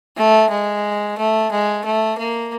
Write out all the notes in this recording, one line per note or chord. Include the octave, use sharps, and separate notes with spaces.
A3
G#3
A3
G#3
A3
A#3